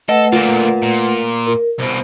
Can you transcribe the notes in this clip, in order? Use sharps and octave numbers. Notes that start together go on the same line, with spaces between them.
A3 A4 B4 D#5 F#5
A#2 D3 F4 A#4
A#2
A#4
C2 B2 C5